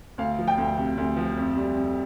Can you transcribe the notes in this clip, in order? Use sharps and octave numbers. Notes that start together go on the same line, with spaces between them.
D2 F5
F3
G5
D2
C3
D2
F3
F2
G3
F2